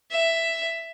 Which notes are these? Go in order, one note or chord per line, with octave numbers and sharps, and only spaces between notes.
E5